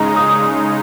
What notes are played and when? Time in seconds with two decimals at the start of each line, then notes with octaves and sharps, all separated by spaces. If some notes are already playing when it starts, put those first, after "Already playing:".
Already playing: C#3 G#3 D#4 A#5
0.16 D#6